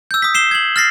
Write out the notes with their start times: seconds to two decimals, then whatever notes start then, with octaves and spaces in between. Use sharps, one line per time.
0.11 E6 G6
0.22 D#6 B6
0.34 C7 E7 G7
0.51 G#6 F#7
0.76 F6 A6 A#6 C7